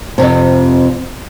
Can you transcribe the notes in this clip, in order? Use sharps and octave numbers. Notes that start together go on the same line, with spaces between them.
F2 A2 C3